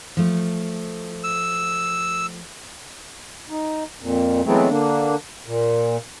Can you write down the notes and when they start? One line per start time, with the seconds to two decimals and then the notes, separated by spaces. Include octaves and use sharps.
0.17 F3 A3
1.24 E6
3.50 D#4
4.01 F2 A#2
4.46 E3 F#3 G#3 A3 B3 C4
4.69 D3 A#3 D4
5.46 A#2